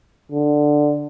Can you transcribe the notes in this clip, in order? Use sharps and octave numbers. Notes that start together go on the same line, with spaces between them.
D3